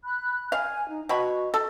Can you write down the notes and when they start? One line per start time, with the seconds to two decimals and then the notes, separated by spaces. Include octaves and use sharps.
0.04 B5 F#6
0.52 F5 G#5
0.88 D#4
1.09 B2 F#4 C#5 B5
1.54 A4